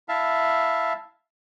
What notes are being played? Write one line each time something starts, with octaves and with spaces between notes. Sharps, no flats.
E4 E5 F5 A5